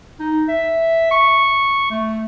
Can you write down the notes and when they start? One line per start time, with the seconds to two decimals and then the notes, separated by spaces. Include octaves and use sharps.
0.20 D#4
0.48 E5
1.11 C#6
1.91 A3